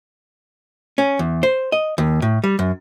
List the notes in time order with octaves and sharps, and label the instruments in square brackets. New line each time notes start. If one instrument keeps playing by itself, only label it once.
[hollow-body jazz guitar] C#4
E2
C5
D#5
D#2
A2
G3
F#2